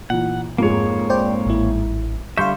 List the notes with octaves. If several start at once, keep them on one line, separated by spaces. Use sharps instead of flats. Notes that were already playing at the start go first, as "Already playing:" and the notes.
A#2 E3 F#5
F2 G#2 G#3 A#3 C#5
C5 D5 G5
A1 E4
D3 G3 E5 F5 C6 C#6 G6